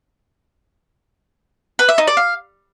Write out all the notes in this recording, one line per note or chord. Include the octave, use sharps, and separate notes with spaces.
B4
E5
D#4
D5
F5